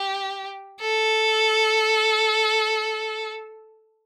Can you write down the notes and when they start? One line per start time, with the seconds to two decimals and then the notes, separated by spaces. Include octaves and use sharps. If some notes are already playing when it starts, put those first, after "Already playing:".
Already playing: G4
0.81 A4